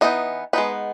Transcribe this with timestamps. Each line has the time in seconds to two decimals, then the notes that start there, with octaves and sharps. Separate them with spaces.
0.01 E3 B3 D#4 D#5
0.53 G#3 B3 D#4 B4